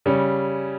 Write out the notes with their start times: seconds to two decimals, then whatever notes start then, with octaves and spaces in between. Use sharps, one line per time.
0.06 C#3 G3 C#4